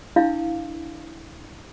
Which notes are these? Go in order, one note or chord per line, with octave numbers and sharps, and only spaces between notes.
D4 E4 F5